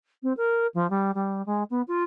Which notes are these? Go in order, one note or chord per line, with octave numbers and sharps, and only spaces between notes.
C4
A#4
F3
G3
G3
G#3
B3
F4